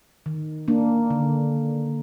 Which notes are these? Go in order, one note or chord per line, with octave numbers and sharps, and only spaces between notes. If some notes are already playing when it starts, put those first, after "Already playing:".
D#3
A#3 D4
D3